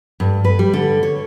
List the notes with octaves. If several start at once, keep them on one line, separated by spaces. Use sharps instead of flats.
G2
B4
G3
D3
C#5